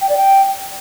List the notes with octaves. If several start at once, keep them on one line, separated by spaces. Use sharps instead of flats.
G5
D5
G5